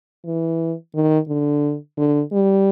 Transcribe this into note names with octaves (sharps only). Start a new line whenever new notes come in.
E3
D#3
D3
D3
G3